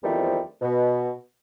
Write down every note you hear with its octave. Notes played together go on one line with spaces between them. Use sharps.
E2 D#3 F3 G3 A3 C4
B2